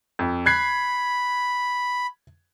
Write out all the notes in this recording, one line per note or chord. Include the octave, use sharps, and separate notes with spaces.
F2
B5 F#6 G#6 C7